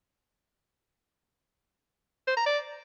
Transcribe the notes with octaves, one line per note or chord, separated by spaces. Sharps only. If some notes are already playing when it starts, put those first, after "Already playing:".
C5
A#5
D5